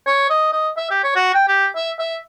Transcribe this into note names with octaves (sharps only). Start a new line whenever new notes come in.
C#5
D#5
D#5
E5
G4
C#5
F#4
G5
G4
E5
E5